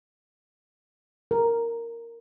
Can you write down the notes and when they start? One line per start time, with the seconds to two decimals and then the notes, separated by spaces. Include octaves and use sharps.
1.31 A#4